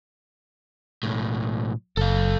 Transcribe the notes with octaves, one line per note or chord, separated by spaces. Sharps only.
B1 A2
F#1 A4 F5